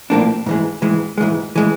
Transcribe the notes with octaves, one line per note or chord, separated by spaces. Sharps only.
B1 A2 F3 A#3 D4
G#2 E3 G#3
G#2 E3 G#3
G#2 E3 G#3
E3 G#3